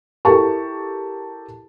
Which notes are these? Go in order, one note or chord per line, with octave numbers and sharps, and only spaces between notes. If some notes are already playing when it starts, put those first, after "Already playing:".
E4 G4 A4 A#4 A5 C#6